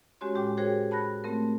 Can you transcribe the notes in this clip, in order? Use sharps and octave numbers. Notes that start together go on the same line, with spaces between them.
G#3 C#4 F#4 G4 C#5 C6
A2 G#3 G4 G5 D6
F#4 G#4 A#4 C5 C#5 G5
A5 B5 F#6 A#6
A3 C4 A#4